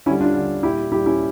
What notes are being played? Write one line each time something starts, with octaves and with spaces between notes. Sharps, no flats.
D3 G3 C#4 E4
D4 F4
D3 G3
A#2 G3 E4 G4
A#2 G3 E4 G4
C#4 E4